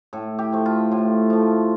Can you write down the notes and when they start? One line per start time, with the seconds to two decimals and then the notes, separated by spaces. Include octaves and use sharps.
0.13 A2 A4
0.39 G4
0.52 F3 A3
0.66 F4
0.91 A2 F4
1.30 F3 A3